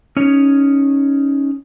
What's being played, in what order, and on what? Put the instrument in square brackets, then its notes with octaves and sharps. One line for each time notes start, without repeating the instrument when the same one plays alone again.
[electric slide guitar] C#4 D#4 C#5